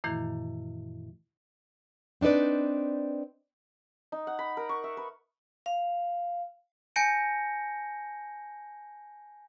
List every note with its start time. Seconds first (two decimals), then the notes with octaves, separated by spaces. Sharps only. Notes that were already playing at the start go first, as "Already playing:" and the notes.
0.04 F#2 A#2 D#3 E3 A3 E4
2.21 C4 D4 D#4 B4 D5
4.12 D#4
4.27 F#5
4.39 B5
4.57 A#4
4.69 C#6
4.84 E5
4.97 B4
5.66 F5
6.96 G#5 A5 G6 A#6 C#7 D7